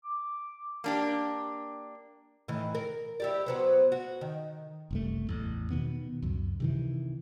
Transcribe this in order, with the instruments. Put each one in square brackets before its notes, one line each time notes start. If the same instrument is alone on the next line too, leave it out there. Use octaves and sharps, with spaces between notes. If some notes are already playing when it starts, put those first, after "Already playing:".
[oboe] D6
[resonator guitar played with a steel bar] A#3 D4 G4
[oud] A2 D#3 E3
A#4
E4 G4 D5
F#3 B3 C5
F#4
D#3
[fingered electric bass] F#1 C2 A3
A1 E2
B2 D#3 B3
C#2 F#2
C3 D#3 E3